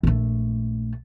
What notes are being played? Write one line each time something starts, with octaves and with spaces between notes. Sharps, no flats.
A#1 A3